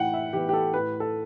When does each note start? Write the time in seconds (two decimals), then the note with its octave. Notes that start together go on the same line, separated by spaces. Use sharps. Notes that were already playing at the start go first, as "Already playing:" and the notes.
Already playing: A2 E3 F#5 G5
0.13 E5
0.33 E3 B3 G4
0.49 G4
0.53 A4
0.73 A2 B4
1.00 A4